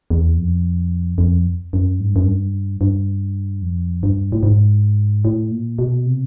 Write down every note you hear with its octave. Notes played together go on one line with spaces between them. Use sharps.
E2
F2
F2
F#2
G#2
G2
F#2
G2
G2
F2
G2
A2
G#2
A2
A#2
B2
C3